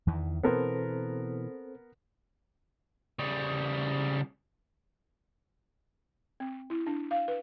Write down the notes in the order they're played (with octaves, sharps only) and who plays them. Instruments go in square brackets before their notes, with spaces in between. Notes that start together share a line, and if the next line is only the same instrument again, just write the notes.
[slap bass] E2 D#3 E3
[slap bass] B2 E3 [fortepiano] B3 A#4 [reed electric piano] C4 A4 C5
[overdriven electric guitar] C#3 G3
[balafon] C4
E4
D4
F5
B4